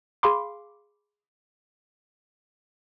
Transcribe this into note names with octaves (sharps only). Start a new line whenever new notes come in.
G#4 F5 B5 C6 D6